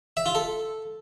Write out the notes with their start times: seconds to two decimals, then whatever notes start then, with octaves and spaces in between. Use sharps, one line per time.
0.17 E5
0.26 F4
0.35 A4